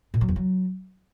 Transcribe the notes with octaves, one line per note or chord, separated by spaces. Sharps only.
A#2
F#3
E2
F#3